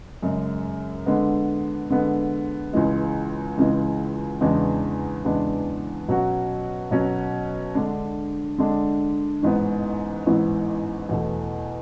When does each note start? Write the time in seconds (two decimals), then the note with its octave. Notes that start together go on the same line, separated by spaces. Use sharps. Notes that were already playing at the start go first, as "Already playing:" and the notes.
0.23 F#2 C#3 G#3
1.06 D3 G#3 B3
1.90 D3 G#3 B3
2.73 C#2 C#3 E3 G#3
3.57 C#2 C#3 E3 G#3
4.41 E2 C#3 G#3 B3 D4
5.24 E2 C#3 G#3 B3 D4
6.08 B2 F#3 C#4 F#4
6.91 B2 F#3 C#4 F#4
7.75 D3 G#3 D4
8.58 D3 G#3 D4
9.43 A1 G#2 E3 B3
10.26 A1 G#2 E3 B3
11.09 E2 B2 A3